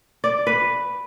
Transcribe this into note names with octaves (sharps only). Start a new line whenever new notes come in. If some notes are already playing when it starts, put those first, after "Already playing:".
D5
B4